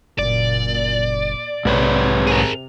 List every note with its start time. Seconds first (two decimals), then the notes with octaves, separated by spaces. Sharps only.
0.19 F#1 A#2 D5
1.65 B1 G#2 C3 B4 C#5
2.27 G#4 A#4